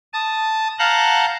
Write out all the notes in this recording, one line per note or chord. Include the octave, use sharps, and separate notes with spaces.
A5 D#6
F5 F#5 A5 A#5 F#6 G6